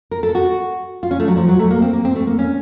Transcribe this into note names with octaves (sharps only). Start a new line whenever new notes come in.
A#4
A4
F#4
F4
C#4
A3
F#3
F3
F#3
A3
A#3
C4
A#3
C4
A3
A#3
C#4